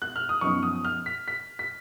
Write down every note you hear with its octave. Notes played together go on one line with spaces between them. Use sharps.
F#6
F6
D#6
F#2 F3 B3 D#4 C#6
D#6
F6
B6
B6
B6